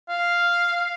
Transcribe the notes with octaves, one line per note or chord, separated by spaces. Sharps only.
F5